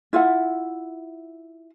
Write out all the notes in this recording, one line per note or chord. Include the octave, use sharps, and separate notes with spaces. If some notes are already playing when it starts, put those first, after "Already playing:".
E4 F4 E5 F#5